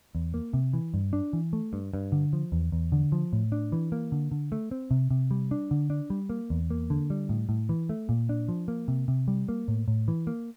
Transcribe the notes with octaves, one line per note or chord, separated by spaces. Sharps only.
E2
A#3
C3
E3
G2
D4
E3
A3
G2
G2
D3
F3
E2
E2
D3
F3
A2
D4
E3
A#3
D3
D3
A3
C4
C3
C3
G3
D4
D3
D4
G3
A#3
E2
A#3
D3
G3
A2
A2
E3
A3
A#2
D4
F3
A#3
C3
C3
G3
A#3
A2
A2
E3
A#3